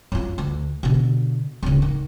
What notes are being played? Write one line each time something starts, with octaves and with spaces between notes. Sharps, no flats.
F#2 F4
D2
B2 D3
D1 C#3
D#3